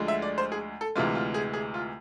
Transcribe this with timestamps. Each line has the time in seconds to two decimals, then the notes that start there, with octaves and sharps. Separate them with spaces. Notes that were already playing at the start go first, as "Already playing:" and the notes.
Already playing: D2 D3 F3 G#3
0.08 E5
0.22 D5
0.38 C5
0.52 G#4
0.81 A4
0.95 D2 C3 E3 G#3 F4
1.15 F4
1.34 G#4
1.53 G#4
1.74 F4